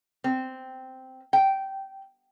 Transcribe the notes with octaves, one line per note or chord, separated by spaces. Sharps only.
C4
G5